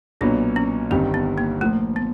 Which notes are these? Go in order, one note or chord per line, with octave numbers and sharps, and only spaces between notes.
B1 A#2 F#3 B3 D4
C#4
G1 G2 D#3 G3 C4
B3
A#3
A#2 F3 A3 A#3
B3